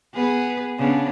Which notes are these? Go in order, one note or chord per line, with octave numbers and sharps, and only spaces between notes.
B3 G#4 B4
C#3 B3 D4